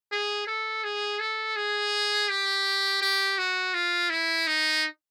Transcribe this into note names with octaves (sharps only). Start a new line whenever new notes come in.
G#4
A4
G#4
A4
G#4
G4
G4
F#4
F4
E4
D#4